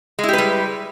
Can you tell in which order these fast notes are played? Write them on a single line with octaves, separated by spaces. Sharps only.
G#3 E4 G4 B4 G3